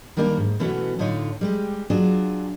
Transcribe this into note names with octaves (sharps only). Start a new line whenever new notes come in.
D#3 G3 A#3 D4 G4 A#4
G#2
B2 E3 A3 B3 C#4 F#4
A2 D3 D#4 F4 C#5
G3 G#3 G4
F#3 D4 F4 F#4 G#4